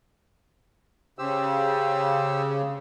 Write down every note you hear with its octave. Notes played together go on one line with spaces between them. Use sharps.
C#3 G4 C5 E6